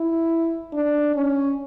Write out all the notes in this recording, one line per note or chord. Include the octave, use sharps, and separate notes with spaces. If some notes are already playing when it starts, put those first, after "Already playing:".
Already playing: E4
D4
C#4